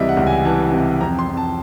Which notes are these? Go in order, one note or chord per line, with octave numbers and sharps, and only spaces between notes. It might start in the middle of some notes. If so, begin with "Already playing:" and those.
Already playing: C#2 C3 E3 G3 D#5 E5
F#5
C#2
G#5
E3 A5
C3
F2 A#5
C6
F2
A5